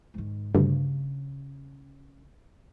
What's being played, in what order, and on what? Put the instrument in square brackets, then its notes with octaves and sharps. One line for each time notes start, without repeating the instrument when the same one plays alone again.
[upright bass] G#2 D#3
[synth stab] D2 G2 [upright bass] C#3